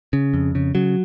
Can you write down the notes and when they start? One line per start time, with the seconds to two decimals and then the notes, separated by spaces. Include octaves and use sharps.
0.13 C#3
0.34 F2
0.55 C#3
0.75 C#3 F#3